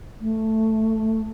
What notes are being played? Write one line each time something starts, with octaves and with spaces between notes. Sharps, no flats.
A3